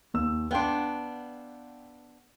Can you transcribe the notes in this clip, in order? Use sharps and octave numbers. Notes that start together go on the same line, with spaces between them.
D#2 E6
B3 D4 F5 G5 C6